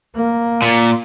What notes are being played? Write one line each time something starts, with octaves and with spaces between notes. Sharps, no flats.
A#3
A#2